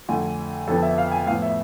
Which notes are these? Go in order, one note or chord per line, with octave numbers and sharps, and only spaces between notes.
F2 D3 A3 G#5
F2 D3 F3 B3 A4
E5
F5
G#5
A2 F3 B3 F5
E5